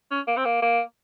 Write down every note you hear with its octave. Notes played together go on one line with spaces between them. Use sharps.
C#4
A#3
C4
A#3
A#3